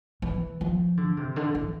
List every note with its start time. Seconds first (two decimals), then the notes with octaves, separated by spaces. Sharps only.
0.22 E3
0.61 F3
0.97 D3
1.17 C3
1.36 D3
1.55 E3